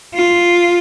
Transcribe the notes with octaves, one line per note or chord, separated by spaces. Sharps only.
F4